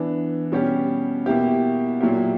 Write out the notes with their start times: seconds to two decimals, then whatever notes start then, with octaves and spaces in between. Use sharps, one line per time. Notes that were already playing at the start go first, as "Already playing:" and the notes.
Already playing: E3 B3 D4
0.52 B2 G3 C#4 G4
1.26 B2 A#3 E4 G4
2.01 A#2 F#3 A#3 E4 G4